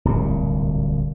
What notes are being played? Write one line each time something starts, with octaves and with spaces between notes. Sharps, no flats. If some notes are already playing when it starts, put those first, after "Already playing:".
D1 C2 A#2